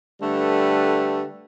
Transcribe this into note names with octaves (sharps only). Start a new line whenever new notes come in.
D3 G3 A3 B4